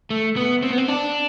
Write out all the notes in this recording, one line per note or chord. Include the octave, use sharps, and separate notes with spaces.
A3
B3
C4
B3
C4
D4